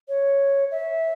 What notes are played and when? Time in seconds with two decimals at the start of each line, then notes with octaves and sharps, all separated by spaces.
0.09 C#5
0.71 E5